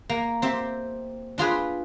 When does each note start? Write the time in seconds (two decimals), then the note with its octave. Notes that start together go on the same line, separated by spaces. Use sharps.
0.10 A#3
0.42 C4 G4 E5
1.38 D4 F4 G#4 B4